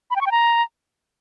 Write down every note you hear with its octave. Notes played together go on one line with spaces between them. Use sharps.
B5
G5
C#6
G5
A#5